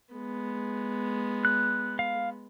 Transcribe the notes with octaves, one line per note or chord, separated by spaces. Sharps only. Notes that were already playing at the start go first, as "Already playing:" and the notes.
G#3 B3
F#6
F5